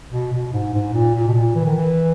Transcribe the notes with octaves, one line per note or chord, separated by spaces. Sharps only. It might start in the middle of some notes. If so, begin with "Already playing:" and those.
B2
B2
G#2
G#2
A#2
A#2
B2
A#2
E3
D#3
E3